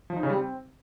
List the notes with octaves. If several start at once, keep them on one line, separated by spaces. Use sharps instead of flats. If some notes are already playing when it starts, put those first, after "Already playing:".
F3
D#4
C#3
G3
C4